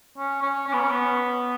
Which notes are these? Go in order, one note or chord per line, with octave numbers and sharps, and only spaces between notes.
C#4
C#4
C#4
B3
C#4
B3